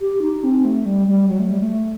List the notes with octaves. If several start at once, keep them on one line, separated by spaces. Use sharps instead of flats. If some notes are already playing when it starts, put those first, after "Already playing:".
G4
D#4
C4
A3
G3
G3
F#3
A3
G3
A3